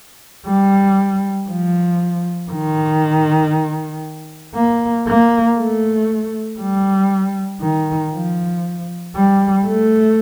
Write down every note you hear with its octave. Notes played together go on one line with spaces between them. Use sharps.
G3
F3
D#3
A#3
A#3
A3
G3
D#3
F3
G3
A3